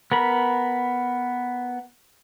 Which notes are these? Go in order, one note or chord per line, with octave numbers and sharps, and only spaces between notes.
B3 A#4 B5